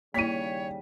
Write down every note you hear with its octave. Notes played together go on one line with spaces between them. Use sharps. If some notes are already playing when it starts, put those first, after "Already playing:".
D#2 C#3 G3 A#3 E4 C#5 B6 D#7